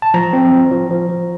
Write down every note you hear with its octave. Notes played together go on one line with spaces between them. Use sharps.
A5
F3 A#5
C4
F3
F3
F3
F3